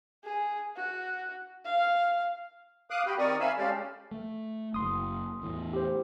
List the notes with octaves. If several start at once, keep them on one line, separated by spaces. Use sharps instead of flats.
G#4
F#4
F5
F5 D6 D#6 F#6
F#4 G4 G5 B5
D#3 C4 A#4 D5 C#6 D#6
E5 F5 G#5 B5 E6
G#3 C#4 G4 A4 D5 F5
A3
F#1 C6 D#6
E2 A2
G4 C5